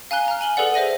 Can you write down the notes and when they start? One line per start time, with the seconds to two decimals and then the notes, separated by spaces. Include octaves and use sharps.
0.11 F5 G#5 A#5 F#6 G7
0.28 A#5 F6
0.41 G#5 F#7 G7
0.57 G#4 A4 B4 D5 F#5
0.74 C5 E5 A#6 D#7